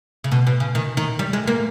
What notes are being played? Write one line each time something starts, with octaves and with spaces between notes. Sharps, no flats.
C#3
B2
B2
C#3
D#3
D#3
G3
G#3
A#3